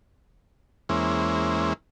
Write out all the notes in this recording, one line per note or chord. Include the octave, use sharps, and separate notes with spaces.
E2 G#3 A#3 C#4 E4 C5